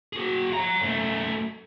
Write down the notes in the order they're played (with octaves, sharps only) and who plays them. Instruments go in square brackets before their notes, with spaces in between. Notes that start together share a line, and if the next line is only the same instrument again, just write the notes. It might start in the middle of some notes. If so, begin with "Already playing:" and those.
[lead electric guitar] F#4 G#4
C#5 A#5
F#2 A3